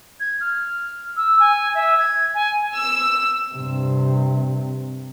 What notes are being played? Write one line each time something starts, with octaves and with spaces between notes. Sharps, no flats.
G#6
F6
E6
G#5
E5
G#6
G#5
E6
G2 C3